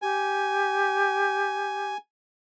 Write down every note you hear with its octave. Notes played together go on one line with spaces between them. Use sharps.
G4 G#5